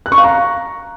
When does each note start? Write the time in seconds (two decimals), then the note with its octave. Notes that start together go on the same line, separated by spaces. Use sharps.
0.06 F#6
0.12 C#6
0.18 F5
0.24 A#5